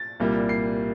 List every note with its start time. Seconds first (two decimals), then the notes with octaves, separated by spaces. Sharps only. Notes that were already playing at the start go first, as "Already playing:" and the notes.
Already playing: A6
0.20 C2 A#2 G3 A#3
0.49 C7